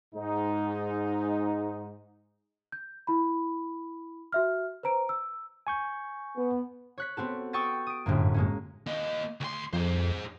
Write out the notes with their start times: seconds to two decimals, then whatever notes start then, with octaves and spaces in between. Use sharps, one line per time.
0.14 G#2 D#4
2.72 G6
3.07 E4 B5
4.32 F#4 E5 F6
4.83 B4 C5 A#5 D7
5.09 E6
5.67 G#5 C#6 G6
6.36 B3
6.98 C#5 F#6 B6
7.17 B3 C4 F#4 A4
7.53 G5 C#6 D#6 E6 A6
7.87 D#6 D7
8.06 G1 F#2 A2 A#3
8.34 G#3 A#3 C#4
8.87 A#3 D#5
9.41 D2 C6
9.73 F2 G#4 C5